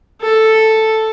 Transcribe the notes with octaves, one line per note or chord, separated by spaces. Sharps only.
A4